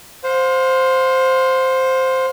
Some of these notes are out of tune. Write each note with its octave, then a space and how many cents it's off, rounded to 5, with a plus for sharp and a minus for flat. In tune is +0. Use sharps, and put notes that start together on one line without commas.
C5 +0 F5 +35